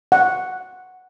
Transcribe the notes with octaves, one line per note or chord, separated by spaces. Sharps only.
F#5